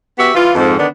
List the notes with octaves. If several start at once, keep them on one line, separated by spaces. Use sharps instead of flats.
B3 F#4 G4 E5
E3 F4
F2 G#2
D3 D#3 B3 D4